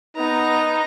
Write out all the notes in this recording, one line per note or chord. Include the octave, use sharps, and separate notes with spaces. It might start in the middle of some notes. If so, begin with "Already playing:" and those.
B3 D#4 A#5